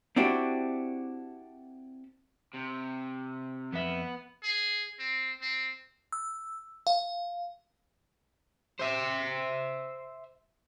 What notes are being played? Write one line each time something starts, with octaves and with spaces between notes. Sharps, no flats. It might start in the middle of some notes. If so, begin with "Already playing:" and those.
C4 D4 E4 F#4 G4
C3
F2 B3 B4 E5
G#4
C4
C4
E6
F5
C5 E5